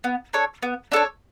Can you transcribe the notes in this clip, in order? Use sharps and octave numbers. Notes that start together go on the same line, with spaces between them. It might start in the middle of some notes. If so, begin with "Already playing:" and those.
B3
D4 A4 C#5
B3
D4 A4 C#5